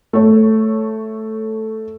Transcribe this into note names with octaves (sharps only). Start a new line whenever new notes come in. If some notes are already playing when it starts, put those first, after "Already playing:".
A3 C#5